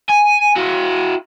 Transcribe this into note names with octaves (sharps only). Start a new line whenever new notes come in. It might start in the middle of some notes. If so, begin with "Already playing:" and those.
G#5
E4 F#4